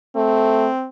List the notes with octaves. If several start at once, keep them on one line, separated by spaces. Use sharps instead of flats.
A3 C4